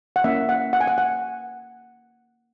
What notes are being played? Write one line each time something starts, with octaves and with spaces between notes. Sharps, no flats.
F#5
A#3 C#4 E4 E5
F#5
F#5
G#5
F#5
F#5